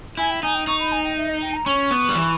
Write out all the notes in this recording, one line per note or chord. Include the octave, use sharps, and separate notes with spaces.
E4 G#5
G5
D#4 G#5
G5
D#4 C#6
B5
G#5
G5
E5
D#5
G5
A#5
C#4 C#6
B3
G3
E3